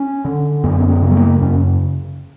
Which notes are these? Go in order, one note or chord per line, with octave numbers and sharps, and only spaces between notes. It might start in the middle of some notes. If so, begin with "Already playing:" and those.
Already playing: C#4
D3
F#2 B3
C#4
B3
C#3
G3
A#3
F#2 C#4